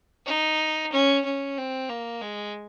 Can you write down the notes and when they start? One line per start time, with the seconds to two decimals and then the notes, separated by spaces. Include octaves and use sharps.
0.26 D#4
0.92 C#4
1.25 C#4
1.57 C4
1.89 A#3
2.22 G#3